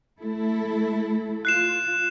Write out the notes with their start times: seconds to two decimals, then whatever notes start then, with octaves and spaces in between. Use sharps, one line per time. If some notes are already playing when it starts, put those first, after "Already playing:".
0.19 A3 E4 A4
1.45 F4 F#6 C7 E7